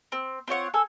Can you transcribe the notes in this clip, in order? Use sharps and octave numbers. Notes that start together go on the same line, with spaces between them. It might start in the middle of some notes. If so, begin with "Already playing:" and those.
C4
C4 F4 C#5 F#5
A4 G#5 E6